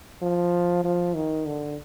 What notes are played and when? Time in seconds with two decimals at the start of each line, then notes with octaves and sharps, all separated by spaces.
0.22 F3
0.84 F3
1.15 D#3
1.46 D3